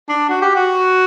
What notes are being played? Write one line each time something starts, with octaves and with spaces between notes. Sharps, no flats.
D4
F#4
G4
F#4